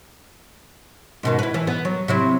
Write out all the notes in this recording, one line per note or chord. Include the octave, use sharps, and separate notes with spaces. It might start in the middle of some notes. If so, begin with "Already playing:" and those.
G#2 B2 D#3
E4 B4
E3
B3
F#3
C3 F#3 E4